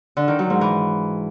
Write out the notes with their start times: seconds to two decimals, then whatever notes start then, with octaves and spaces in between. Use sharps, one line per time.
0.17 D3
0.28 D#3
0.39 F#3
0.50 G#2
0.61 E3